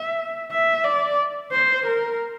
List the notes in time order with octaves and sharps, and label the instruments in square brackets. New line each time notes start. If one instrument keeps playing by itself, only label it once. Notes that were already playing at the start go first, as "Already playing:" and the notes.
Already playing: [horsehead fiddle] E5
E5
D5
C5
A#4